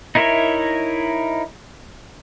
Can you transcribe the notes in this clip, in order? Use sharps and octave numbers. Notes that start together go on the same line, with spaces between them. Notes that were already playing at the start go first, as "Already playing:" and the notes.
D#4 E4 A#4 C#5 E5